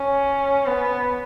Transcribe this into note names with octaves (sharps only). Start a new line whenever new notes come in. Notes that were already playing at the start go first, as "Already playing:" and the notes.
Already playing: C#4
B3